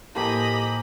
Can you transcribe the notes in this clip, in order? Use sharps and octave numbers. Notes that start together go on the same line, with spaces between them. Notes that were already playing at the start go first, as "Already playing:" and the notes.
A2 F3 A#3 E4 G4 D#5 G#5 B5